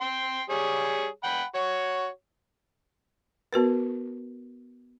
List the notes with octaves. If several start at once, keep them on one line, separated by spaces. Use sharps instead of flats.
G5 C6
G3 G#4 C#5
F#5 G5 B5
F#4 C#5
B3 F#4 A#4 B4